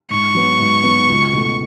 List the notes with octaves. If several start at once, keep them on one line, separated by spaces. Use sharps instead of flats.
G#2 C#6
F#3 B3
G#2
F#3 B3
C#2
B2 A3